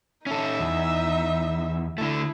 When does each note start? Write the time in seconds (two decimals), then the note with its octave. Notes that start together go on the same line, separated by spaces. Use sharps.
0.27 C#4 D#4 A4 E5
0.59 E2
1.98 D3 A3 E4